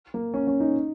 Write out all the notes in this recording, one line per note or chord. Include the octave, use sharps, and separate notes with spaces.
A#3
C#4
C#4
D#4